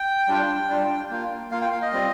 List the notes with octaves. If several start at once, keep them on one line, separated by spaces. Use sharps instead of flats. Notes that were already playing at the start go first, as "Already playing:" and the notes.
Already playing: G5
G3 D4 F4
G3 D4 F4
A#3 F4
A#3 F4 F5
G5
F5
D#5
G3 C4 F4